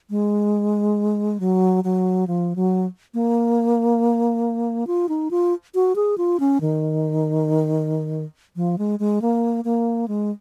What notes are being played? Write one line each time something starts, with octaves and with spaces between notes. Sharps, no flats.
G#3
F#3
F#3
F3
F#3
A#3
F4
D#4
F4
F#4
G#4
F4
C#4
D#3
F3
G#3
G#3
A#3
A#3
G#3